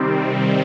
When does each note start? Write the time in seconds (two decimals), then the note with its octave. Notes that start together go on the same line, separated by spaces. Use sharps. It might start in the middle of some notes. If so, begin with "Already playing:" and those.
Already playing: C3 D#3 G3 C4